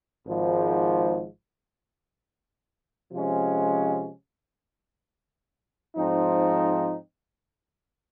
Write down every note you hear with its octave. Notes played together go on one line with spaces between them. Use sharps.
G#1 G#2 F3
C3 F3 G#3 C#4
G#2 F3 C4 D#4